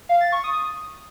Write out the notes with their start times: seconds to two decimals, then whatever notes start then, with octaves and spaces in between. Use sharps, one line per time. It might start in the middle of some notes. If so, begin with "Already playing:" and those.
0.09 F5
0.21 A6
0.32 C#6
0.44 D#6